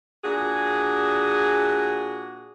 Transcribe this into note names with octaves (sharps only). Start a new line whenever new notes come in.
A#2 D4 F#4 G#4